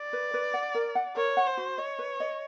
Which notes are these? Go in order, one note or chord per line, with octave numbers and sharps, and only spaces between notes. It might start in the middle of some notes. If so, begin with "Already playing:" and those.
Already playing: D5
B4
B4
F#5
A#4
F#5
A#4 C#5
F#5
C5
F#4
C#5 D#5
B4
D#5